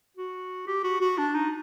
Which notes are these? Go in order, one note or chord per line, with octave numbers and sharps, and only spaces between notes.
F#4
G4
F#4
F#4
D4
D#4